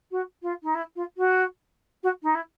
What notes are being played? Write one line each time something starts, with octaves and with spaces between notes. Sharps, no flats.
F#4
F4
D#4
E4
F4
F#4
F#4
D#4
E4